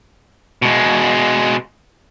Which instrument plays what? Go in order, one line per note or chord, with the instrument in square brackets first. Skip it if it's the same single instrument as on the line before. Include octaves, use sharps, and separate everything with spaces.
[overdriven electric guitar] B2 G#3